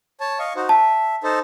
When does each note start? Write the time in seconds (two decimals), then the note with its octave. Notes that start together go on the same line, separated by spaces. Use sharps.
0.20 C#5 A5
0.39 D#5 F5 C#6
0.56 D#4 F#4 C5
0.69 E5 A5
1.23 D#4 A4 C5